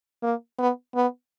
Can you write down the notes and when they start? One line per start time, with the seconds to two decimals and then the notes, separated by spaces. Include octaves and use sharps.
0.23 A#3
0.59 B3
0.95 B3